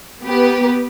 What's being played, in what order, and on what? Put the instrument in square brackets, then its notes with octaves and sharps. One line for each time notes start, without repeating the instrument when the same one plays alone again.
[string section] B3 G4 B4